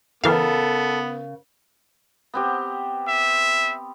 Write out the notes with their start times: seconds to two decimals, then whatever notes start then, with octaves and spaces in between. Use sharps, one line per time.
0.24 C#3 E3 B3 A4 A#4 F5
2.34 B3 C4 G4
3.08 E5